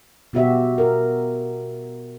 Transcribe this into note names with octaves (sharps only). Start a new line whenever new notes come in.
B2 B3 F#4 G4 E5
A#4